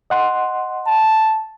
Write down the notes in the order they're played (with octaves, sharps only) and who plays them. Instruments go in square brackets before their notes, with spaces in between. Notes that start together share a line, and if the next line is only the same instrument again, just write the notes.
[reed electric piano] D#5 F#5 C6
[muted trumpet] A5